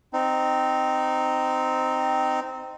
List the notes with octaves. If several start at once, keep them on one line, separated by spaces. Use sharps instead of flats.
C4 D#4